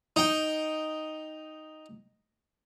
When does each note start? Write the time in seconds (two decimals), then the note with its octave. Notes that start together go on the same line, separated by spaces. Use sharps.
0.16 D#4 G5